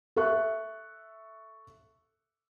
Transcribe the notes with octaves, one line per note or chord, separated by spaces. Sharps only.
A4 E5 C#6 F#6